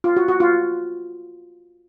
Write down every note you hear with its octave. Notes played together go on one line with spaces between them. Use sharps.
F4
F#4
F#4
F4